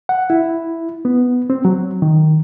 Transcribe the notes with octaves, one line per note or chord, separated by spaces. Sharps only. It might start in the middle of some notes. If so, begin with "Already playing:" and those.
F#5
E4
B3
C4
F#3
D#3